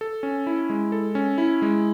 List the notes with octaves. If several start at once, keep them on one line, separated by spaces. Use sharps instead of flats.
A4
C#4
E4
G#3
A4
C#4
E4
G#3